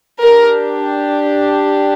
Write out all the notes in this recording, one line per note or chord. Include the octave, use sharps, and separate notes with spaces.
D4 G4 A#4